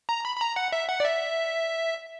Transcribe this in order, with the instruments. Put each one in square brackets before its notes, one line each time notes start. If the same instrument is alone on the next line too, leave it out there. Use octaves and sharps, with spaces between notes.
[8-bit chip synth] A#5
B5
B5
A#5
F#5
E5
F#5
D5
E5